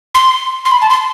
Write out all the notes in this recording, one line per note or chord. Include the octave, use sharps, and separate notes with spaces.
C6
C6
B5
A5
C6